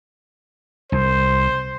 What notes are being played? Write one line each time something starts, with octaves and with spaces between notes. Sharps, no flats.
C2 C5